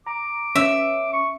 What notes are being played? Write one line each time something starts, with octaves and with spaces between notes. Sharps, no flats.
A#5 D6
C#4 E5
C#6